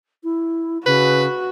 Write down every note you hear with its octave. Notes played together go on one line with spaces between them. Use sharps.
E4
C#3 F#4 B4